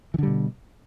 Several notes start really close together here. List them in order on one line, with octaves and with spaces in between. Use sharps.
E3 D3 G3 B2